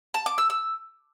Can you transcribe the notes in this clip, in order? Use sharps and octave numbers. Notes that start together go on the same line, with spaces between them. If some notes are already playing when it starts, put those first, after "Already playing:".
A5
D6
E6
E6